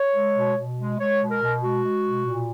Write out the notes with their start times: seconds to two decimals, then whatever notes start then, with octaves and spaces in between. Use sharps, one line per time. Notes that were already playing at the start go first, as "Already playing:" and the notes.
Already playing: C#5
0.14 G#3
0.35 B2
0.57 B2
0.78 G#3
0.99 G#3 C#5
1.20 B2
1.31 A#4
1.41 B2
1.62 G#3 F#4
1.84 G#3
2.05 B2
2.26 A#2